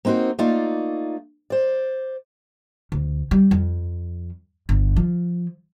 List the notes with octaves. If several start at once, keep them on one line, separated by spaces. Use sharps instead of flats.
A#3 C4 D#4 F#4 C5
A3 A#3 D#4 F4 D5
C5 D5
D2
G3
F2
G1
F3